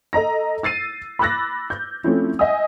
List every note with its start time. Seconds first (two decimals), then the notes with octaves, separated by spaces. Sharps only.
0.13 A4 D#5 A#5 A#6
0.63 E6 A6 C7 D#7
1.19 B5 D6 E6 F#6 A6 A#6
1.70 G6
2.04 F3 A3 C4 C#4 E4
2.39 D#5 E5 F#5 G#5 D#6